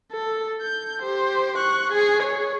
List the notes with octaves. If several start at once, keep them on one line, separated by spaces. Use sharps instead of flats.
A4
G6
G4 C5
C#6 F#6
G#4 G#5
C#5